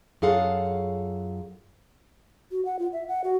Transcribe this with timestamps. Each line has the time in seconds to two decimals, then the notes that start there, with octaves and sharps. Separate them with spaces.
0.22 F#2 F4 G#4 A4 F5 F#5
2.52 F#4
2.65 F#5
2.79 F4
2.93 E5
3.08 F#5
3.24 F#4